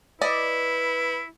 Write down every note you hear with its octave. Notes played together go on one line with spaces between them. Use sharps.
E4 B4 D5 D#5